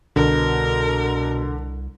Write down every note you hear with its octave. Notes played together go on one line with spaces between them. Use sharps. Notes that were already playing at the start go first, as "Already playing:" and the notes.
C2 B2 D3 A#4